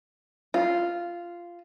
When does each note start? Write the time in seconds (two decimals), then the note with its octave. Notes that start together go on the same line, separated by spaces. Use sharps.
0.54 F4